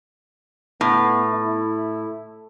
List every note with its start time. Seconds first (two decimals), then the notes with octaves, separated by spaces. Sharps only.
0.81 A2 B3
1.33 E4